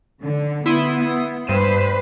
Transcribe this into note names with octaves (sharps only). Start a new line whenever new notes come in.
D3
B3 E4 C6 D#6
G2 B4 C5 D#7 E7